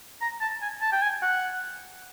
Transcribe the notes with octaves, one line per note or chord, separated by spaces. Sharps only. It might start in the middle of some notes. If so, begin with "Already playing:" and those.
A#5
A5
G#5
A5
G5
G#5
F#5